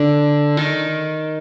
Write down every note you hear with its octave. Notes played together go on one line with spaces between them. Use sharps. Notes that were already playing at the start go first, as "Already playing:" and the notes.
Already playing: D3
D#3